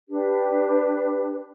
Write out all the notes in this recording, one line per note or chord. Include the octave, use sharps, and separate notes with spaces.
D4 G4 B4